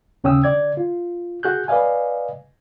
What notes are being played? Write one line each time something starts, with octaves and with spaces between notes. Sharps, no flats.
D#2 C#3 C#4 G5 D#6 E6
D3 D5 G#6
F4
F#4 G#4 F#6 G6
B4 D5 D#5 F5 G#5